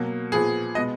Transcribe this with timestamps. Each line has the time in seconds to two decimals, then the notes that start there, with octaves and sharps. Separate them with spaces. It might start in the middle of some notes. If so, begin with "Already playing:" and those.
Already playing: B2 F#3 A#3
0.32 A#2 F3 B3 G#4
0.75 B2 G#3 B3 D#5